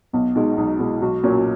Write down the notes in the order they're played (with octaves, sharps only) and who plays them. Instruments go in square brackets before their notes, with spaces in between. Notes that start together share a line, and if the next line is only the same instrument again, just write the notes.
[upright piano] B1 [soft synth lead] B3
[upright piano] B2 G#3 [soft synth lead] D#4
[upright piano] B1 [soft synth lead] D#4
[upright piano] B2 G#3 [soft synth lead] E4
[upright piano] B1 [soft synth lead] F#4
[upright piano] A#2 F#3 C#4